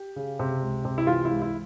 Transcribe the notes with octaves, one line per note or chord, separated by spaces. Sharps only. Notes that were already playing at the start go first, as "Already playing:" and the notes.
Already playing: G4
C#3
C3
C#2
C3
E4
E3 F4
E4
C#2
E4